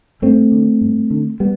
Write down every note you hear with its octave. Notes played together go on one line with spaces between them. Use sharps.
G2 A3 C4
D3
G2
D3
G3 B3